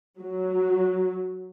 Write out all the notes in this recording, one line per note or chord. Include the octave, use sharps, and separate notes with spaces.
F#3